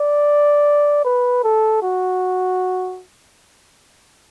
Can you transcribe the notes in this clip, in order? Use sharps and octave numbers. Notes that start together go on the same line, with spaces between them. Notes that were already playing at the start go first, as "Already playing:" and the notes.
Already playing: D5
B4
A4
F#4